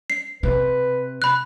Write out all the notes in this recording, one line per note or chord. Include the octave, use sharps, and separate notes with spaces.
C7
C3 B4
B5 F#6